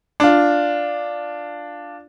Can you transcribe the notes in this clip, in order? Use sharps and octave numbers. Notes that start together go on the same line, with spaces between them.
D4 F4